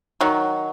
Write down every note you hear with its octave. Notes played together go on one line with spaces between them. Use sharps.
D#3 F#3